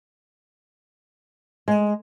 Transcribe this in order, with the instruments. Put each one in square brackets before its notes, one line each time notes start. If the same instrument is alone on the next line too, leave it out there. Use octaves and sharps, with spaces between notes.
[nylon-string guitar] G#3